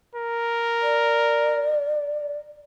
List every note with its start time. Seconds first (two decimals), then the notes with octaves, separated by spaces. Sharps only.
0.15 A#4
0.82 D5